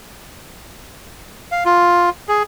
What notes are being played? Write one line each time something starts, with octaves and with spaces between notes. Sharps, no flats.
F5
F4
G#4